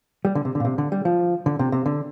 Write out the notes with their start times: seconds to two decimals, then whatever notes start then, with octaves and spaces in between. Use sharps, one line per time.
0.25 G3
0.35 D3
0.45 C3
0.55 D3
0.60 A#2
0.65 C3
0.78 D3
0.92 G3
1.05 F3
1.46 D3
1.59 C3
1.72 C3
1.86 D3